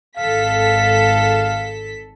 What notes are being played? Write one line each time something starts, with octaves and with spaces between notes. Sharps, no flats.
G#1 A4 F5 B6